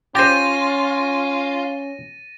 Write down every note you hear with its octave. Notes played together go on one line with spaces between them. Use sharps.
C#4 F4 G4 C5 A6 A#6 D#7